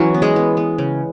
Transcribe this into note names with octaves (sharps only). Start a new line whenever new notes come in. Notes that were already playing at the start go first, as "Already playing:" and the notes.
Already playing: E3 F#3 C#4 F#4
B3
G#3 G#4
B3
B3
C#3